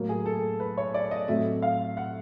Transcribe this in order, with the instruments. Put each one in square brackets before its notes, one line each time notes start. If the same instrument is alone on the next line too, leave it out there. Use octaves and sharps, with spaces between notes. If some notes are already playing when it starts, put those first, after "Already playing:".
Already playing: [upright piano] A2 F#3 A#3
G#4
A4
B4
C#5
D5
D#5
A2 F#3 A3 C4 E5
F5
F#5